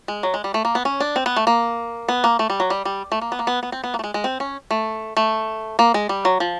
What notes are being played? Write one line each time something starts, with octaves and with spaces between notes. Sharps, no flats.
G#3
F#3
G#3
G3
A3
A#3
B3
C#4
D4
C4
B3
A3
A#3
B3
A#3
A3
G3
F#3
G3
G3
A3
A#3
B3
A#3
B3
B3
C4
B3
A#3
A3
G#3
G#3
C4
C#4
A3
A3
A#3
G#3
G3
F#3
F3